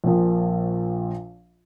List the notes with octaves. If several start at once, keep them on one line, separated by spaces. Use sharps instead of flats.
A#1 A#2 F3